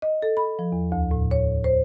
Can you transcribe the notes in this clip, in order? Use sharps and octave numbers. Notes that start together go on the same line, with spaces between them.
D#5
A4
B5
F3
E2
D2
A2
C#5
C5